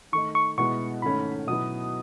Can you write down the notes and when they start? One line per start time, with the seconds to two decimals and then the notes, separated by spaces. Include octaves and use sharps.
0.12 D#3 A3 D#4 C#6
0.35 C#6
0.58 B2 G#3 B3 E4 C#6
1.02 G#2 D#3 A3 C#4 B5
1.47 B2 F#3 B3 E4 D#6